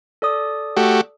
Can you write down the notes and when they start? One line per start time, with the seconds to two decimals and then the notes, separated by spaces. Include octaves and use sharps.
0.22 A4 D5 D#6
0.77 A3 F#4 G4